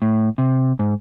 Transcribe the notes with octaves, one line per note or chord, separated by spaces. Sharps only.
A2
C3
G#2